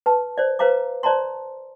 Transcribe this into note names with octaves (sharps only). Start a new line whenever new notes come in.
B4 A5
C5 D5
B4 C5 F5 A#5 D6
C5 D5 A5 A#5 C6